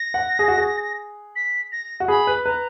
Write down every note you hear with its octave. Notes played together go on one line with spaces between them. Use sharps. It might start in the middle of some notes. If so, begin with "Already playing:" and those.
Already playing: A#6
F#5
G#4
F#4
G#4
B6
A#6
F#4
G#4 B5
B4
B4 A#5